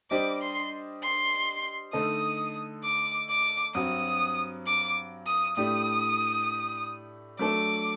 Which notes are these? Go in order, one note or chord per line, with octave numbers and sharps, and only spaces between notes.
G3 D4 G4 C5 D#5 D6
C6
C6
D3 A3 D#4 A4 D#5 D#6
D6
D6
G2 F#3 C4 F#4 D#6
D6
D#6
A2 A3 D4 G4 D5 D#6
F#3 A3 D4 A4 D6